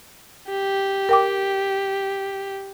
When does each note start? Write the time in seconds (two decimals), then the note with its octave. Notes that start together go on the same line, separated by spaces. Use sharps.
0.49 G4
1.09 A#4 G5 D6